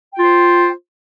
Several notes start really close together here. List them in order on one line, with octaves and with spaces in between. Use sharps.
G5 F4 C5